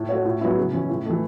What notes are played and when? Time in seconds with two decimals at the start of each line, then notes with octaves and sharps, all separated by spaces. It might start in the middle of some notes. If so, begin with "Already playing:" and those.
Already playing: A2
0.09 A3 F#4 C#5
0.25 A2
0.41 F#3 B3 E4
0.57 C#3
0.73 E3 C#4
0.89 A2
1.05 E3 A3